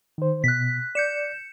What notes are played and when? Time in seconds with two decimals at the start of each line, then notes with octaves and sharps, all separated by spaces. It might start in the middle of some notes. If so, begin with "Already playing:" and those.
0.18 D#3 C5
0.44 B2 F#6 B6
0.95 D5 G6 C#7 E7